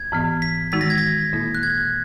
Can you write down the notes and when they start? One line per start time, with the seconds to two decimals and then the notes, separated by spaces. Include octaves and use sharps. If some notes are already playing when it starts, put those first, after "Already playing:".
Already playing: G#6
0.12 G#2 E3 B3
0.42 B6
0.72 D#3 G#3 D#4 F#4 B6
0.81 A#6
0.90 G#6
0.98 A#6
1.33 A#2 A#3 E4
1.55 F#6
1.63 G#6